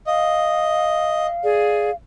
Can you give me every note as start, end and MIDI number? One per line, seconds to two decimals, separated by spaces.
0.07 1.27 75
0.07 1.95 77
1.44 1.91 68
1.44 1.91 74